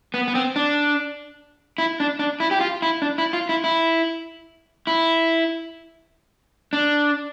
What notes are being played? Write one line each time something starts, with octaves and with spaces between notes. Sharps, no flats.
B3
B3
C4
D4
E4
D4
D4
E4
G4
F4
E4
D4
E4
F4
E4
E4
E4
D4